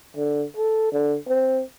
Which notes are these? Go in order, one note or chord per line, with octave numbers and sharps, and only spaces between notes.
D3
A4
D3
C4